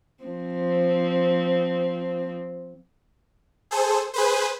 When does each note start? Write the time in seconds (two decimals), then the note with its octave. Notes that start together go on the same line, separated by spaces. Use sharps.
0.24 F3 C4
3.71 G#4 A4 C5
4.14 G#4 B4 C5